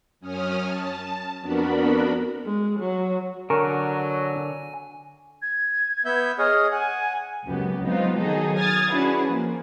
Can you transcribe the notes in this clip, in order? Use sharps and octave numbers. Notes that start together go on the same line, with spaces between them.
F#2 C#4 D#6 F6
A5
F2 B3 D4 F#4 A#4 B5
G#3
F#3
D3 F#3 A#4 G#5 C#6
G#6
B3 E5 G6
G#4 C#5 D#5 F6
F#5 G#5
C#2 F#2 F#3 B3 G4
F#3 G#3 B3 C4 D#4 F4
D#3 F#3 D#4 G#4 A4
D#6 F6 G#6 A6
C#4 D4 E4 F#4 G#4 B4
F3 A#3